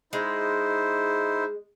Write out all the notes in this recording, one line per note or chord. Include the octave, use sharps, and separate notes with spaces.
G#3 D#4 E4 C5